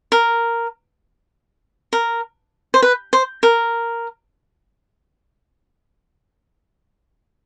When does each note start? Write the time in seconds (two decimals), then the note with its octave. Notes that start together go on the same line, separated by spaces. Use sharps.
0.12 A#4
1.93 A#4
2.74 C5
2.82 B4
3.13 C5
3.43 A#4